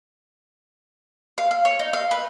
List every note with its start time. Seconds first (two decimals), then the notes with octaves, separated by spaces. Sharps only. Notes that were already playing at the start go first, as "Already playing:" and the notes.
1.38 F5
1.51 F5
1.65 C#5
1.79 D#4
1.93 F5
2.11 B4